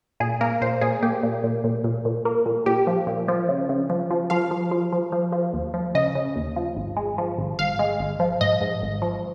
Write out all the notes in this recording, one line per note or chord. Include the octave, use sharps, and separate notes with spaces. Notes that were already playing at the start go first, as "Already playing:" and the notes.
A#2 G#4
A#3 A#4
A#2 C5
A#2 G#4
A#2 G4
A#2
A#2
A#2
A#2
A#2
A#3
A#2
A#2 G4
F3
A#2
F3
C#3
C#3
F3
F3
F3 F5
F3
F3
F3
F3
F3
D#2
F3
C#3 D#5
C#3
D#2
F3
G#1
G#3
F3
G#1
G#1 F5
G#3
G#1
F3
G#2 D#5
G#2
G#1
F3